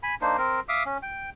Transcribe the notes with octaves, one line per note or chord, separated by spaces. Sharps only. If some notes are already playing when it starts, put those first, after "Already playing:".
G#5 B5
A#3 D4 D#4 C5
C4 A#4
E5 F5 D6 D#6
C#4
G5